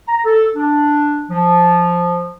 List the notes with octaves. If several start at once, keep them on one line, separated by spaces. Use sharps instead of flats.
A#5
A4
D4
F3